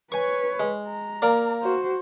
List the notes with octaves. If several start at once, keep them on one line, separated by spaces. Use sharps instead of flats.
B4 C#5 G#5 C#6
G#3
A#5
A#3 D5
F#4 C5